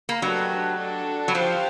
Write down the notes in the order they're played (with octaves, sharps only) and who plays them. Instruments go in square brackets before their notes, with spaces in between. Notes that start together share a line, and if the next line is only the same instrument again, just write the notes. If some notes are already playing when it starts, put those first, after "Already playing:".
[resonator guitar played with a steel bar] A#3
[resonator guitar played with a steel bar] F#3 [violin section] A3 D4 G4 B4 D#5
[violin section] D4 F#4 A4
[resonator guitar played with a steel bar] F#3
[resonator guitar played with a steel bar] F3 [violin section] G4 C5 F5 A5